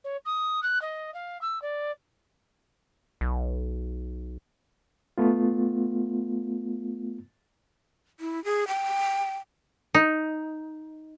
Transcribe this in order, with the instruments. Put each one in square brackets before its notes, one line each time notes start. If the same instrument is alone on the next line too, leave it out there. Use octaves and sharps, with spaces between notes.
[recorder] C#5
D#6
F#6
D#5
F5
E6
D5
[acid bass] B1
[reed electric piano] A3 B3 F4
[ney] E4
G#4
G5
[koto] D#4